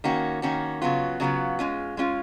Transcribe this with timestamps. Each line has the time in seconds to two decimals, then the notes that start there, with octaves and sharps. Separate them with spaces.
0.04 D#3 A#3 C#4 F#4
0.42 D#3 A#3 C#4 F#4
0.82 C#3 F#3 B3 F4
1.20 C#3 F#3 B3 F4
1.59 G#3 C#4 F4
1.97 G#3 C#4 F4